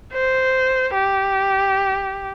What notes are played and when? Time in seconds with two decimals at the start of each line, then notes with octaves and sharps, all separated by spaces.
0.13 C5
0.94 G4